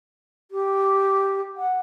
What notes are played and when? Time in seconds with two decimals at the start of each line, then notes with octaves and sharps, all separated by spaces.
0.51 G4
1.57 F#5